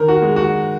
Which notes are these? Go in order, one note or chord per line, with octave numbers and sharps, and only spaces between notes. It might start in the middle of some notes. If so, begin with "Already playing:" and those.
Already playing: D#3 A#4
F#4
G#3
F#4